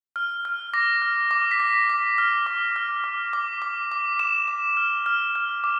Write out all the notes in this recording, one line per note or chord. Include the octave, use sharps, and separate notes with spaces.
F6
F6
D6 A#6
F6
D6
B6
D6 A#6
D6
F6
D6
F6
D6
D6
D6
D6
D6 E7
D6
F6
F6
F6
D6